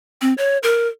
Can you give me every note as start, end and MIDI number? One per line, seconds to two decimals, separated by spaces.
0.22 0.33 60
0.38 0.58 73
0.63 0.87 70